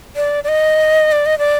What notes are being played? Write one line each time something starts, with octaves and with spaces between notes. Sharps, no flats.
D5
D5
D#5
D5
D#5
D5